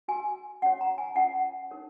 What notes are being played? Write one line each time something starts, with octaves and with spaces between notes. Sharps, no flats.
F#4 B4 G#5
C#4 F#4 C#5 F#5
A#5
G#5
C#4 F4 A#4 C#5 F#5
D#4 A#4 C#5